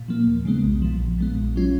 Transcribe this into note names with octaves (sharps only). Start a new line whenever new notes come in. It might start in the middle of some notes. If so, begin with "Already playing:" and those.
Already playing: A#2
F3 A#3
D#2
C#3 G#3 B3
B1
A#2 F3
A#1
A#2 G#3 B3
A#1
F#3 C#4 F4